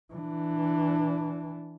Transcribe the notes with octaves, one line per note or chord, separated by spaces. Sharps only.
E3 D4